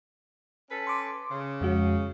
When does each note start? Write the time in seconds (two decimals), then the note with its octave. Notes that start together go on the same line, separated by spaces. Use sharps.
0.70 C#4 A4 B4
0.87 C6 D6
1.31 C#3
1.61 F2 G#3 F#4